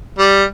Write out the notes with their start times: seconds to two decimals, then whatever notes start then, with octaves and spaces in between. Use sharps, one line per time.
0.19 G3